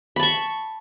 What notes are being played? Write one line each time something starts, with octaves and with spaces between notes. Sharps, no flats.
A5 B5 C#6